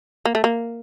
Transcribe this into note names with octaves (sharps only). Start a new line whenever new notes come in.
A#3
A3
A#3